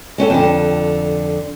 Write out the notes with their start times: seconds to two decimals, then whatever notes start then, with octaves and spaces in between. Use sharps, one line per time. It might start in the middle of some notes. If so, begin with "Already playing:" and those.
0.18 G#3 C#4 F#4 A4
0.30 F2 D3